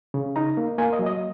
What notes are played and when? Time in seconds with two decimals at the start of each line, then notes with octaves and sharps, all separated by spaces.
0.14 C#3
0.36 D#4 A#5
0.57 A#3
0.78 A#3 G#5
0.93 D#5
0.99 F#3
1.06 D#5